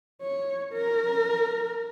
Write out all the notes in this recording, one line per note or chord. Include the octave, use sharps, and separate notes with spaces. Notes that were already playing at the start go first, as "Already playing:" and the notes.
C#5
A#4